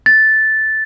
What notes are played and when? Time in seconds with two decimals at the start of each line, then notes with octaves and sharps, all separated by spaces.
0.06 A6